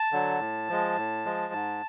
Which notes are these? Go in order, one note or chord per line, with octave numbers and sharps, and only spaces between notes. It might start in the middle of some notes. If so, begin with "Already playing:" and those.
Already playing: A5
D3 F#3
A2
F3 G#3
A2
F3 G#3
G#2